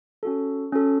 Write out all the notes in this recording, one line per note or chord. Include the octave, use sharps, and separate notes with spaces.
C#4 F#4 A4
C#4 F#4 A4